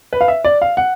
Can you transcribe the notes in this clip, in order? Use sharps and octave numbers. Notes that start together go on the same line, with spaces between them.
B4
F5
E5
D5
F5
F#5